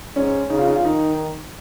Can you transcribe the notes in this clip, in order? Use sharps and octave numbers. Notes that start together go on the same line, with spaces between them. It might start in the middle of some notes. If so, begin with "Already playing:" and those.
G#2 C#4
C#3 D#4
F4
D#4
F4
D#3 D#4